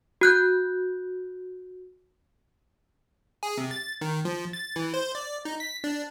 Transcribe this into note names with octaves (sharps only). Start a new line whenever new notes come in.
F#4 F#6 G6
G#4
C3
A6
D#3
F3
A6
E3
C5
D5
D#4
B6
D4